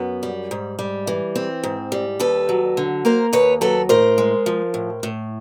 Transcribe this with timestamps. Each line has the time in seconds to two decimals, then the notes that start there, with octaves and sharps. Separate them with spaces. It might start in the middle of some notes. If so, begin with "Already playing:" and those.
Already playing: F#2 B3
0.23 G3
0.51 G#2
0.79 G3
1.07 E3
1.36 C4
1.64 G#2
1.92 G3
2.20 D#2 A4 B4
2.49 F#3
2.77 D3
3.05 A#3 A#4 C5
3.33 D#2 B4 C#5
3.61 F#3 A4 B4
3.89 A2 A#4 C5
4.18 G#3
4.46 F3
4.74 A2
5.03 A2